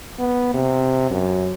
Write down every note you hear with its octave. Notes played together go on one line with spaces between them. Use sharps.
B3
C3
F#2